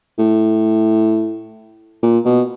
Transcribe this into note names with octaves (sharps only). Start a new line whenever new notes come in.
A2
A#2
B2